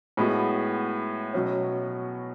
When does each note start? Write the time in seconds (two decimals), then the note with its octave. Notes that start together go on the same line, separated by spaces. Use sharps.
0.17 A2 G#3 B3 F#4
1.34 B2 F#3 C#4